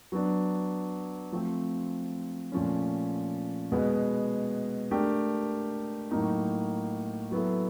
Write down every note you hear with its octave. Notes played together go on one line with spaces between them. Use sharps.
F#3 B3 D4
F3 A3 C4
A#2 F3 A3 C#4
B2 G#3 B3
A3 D4 G4 A#4
A2 F#3 A#3 D#4
F#3 B3 E4 A4